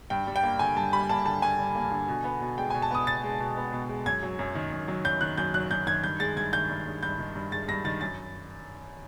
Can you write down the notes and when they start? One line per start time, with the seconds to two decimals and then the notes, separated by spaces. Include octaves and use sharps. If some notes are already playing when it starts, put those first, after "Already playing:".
0.10 G2 G5
0.27 G3
0.36 G5
0.43 A#3
0.59 D3 G#5
0.77 G2 A5
0.93 G3 B5
1.09 A#3 A5
1.25 D3 A5
1.42 G2 G#5
1.59 G3
1.75 A#3
1.91 D3
2.08 B2
2.24 B3
2.41 B2
2.58 G#3 G5
2.70 B2 G#5
2.82 A5
2.91 B3 D#6
3.07 B2 A6
3.24 G#3
3.40 B2
3.57 B3
3.73 B2
3.89 G#3
4.06 F#2 G#6
4.23 F#3
4.39 F#2
4.55 D#3
4.72 F#2
4.88 F#3
5.04 F#2 G6
5.21 D#3 F#6
5.38 F#2 G6
5.54 F#3 F#6
5.71 F#2 G6
5.87 D#3 G#6
6.03 G2 G6
6.20 G#3 A6
6.36 G2 G#6
6.52 D#3 G6
6.69 G2
6.86 G#3
7.03 G2 G6
7.19 D#3
7.36 G2
7.52 G#3 A6
7.68 G2 A#6
7.85 D#3 A6
8.01 F#2 A6